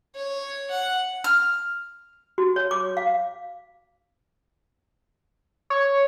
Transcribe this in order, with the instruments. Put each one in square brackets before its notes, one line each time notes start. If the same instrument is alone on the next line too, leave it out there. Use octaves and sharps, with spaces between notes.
[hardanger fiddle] C#5
F#5
[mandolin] F6
[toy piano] F#4
C#5
D6
F5
[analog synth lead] C#5